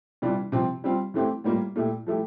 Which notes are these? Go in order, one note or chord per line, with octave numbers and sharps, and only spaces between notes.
C3 E3 G3 D4 F4
C3 F3 C4
G3 C4 F4
E3 A3 C4 E4 G4
A2 G3 A#3 F4
A#2 A3 E4 G4
F3 A3 E4 G4